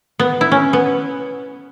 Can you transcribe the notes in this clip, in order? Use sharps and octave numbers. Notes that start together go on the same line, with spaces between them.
B3
E4
C#4
B3